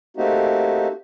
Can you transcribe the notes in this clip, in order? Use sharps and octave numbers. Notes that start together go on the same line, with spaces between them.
A3 A#3 C4 D#4 F#4 G4